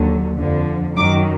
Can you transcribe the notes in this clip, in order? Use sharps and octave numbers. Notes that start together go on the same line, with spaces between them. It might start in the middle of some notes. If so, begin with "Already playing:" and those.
Already playing: D#2 D3 F#3
F2 D3 F3
F#2 D#3 F#3 D6